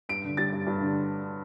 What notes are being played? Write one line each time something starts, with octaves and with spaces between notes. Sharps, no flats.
G2 D7
D3
G3 A6
G2
G2
D3